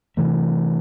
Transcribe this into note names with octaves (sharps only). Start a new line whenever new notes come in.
C3 E3 A3